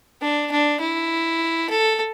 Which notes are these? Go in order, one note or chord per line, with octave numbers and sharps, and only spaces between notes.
D4
D4
E4
A4